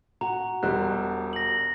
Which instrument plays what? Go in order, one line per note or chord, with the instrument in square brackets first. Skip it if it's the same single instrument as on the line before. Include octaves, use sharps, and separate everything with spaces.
[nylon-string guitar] F#4 F#5 [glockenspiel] A#5
[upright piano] E1 G3 [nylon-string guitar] F#4 C5 [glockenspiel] F#6
[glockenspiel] A#6 F#7